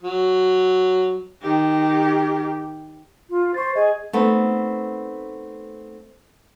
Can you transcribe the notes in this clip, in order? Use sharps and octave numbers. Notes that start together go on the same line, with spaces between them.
F#3
D#3 G4
F4
C5 C#6 A6
G#4 D#5
A3 B3 C4 D#4